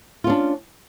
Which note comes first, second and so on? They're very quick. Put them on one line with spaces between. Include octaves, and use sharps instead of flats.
F4 C#4 D4